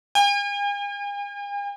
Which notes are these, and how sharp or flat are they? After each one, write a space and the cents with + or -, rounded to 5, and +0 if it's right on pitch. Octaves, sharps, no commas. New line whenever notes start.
G#5 -40